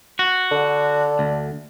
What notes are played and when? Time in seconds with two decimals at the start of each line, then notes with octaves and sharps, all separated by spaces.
0.19 F#4
0.52 D3
1.19 D2